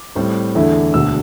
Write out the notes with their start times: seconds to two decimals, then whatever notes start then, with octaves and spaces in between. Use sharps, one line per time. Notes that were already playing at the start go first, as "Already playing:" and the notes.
Already playing: D6
0.15 A2 G3 C4
0.55 E2 D3 A3 E4
0.94 E1 D2 D3 E6